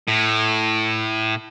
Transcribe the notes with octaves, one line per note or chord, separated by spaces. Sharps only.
A2